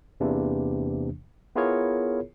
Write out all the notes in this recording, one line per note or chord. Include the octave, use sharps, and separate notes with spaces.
E2 C3 E3 A#3 D4
B3 E4 F4 G#4 A#4 C#5